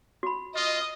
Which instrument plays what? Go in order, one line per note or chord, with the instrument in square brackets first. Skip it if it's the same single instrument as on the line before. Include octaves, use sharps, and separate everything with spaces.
[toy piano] F#4 B5
[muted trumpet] F4 [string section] D#5